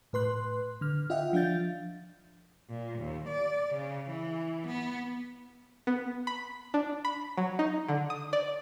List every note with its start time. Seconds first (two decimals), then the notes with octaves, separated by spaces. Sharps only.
0.13 A2 B4 C6 F#6
0.81 D3 F6
1.10 F4 D#5 E5 F#5 G5
1.33 F3 D4 F5 G6 A6
2.69 A#2
2.99 D#2
3.28 D5
3.74 C#3
4.10 E3
4.67 B3
5.87 B3
6.27 B5
6.74 D4
7.05 B5
7.38 F#3
7.59 D#4
7.88 D3
8.10 D#6
8.33 D5